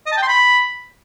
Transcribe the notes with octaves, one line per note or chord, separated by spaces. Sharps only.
D#5
A5
G5
C6
B5